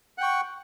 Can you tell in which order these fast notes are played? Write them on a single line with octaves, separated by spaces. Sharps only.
F#5 G5 C#6